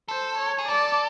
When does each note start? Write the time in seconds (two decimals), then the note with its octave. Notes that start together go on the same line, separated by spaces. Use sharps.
0.08 A4 C5
0.38 C#5
0.59 G#4
0.68 A4 D5